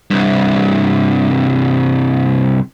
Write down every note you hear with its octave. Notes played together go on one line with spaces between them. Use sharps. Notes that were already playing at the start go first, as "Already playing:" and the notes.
C2 G2